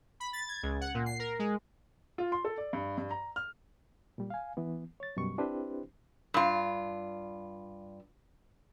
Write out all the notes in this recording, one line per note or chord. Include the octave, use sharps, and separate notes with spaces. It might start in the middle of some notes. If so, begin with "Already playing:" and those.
B5
A6
G#6
C#2
F#5
A#2
C7
A#4
G#3
F4
C6
A4
D5
G2
G2
A#5
F6
A#2 G3
F5 G#5
E3 B3
C#5 A6
F#2 B2 G3 C#6
C4 D4 E4 G4 B4 C5
G2 F4